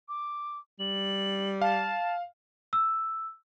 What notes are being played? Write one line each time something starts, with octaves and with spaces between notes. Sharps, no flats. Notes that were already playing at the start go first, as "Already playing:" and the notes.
D6
G3 F#7
F5 A5
E6